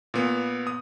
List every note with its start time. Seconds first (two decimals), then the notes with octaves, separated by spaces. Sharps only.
0.14 A#2 B3
0.67 D#6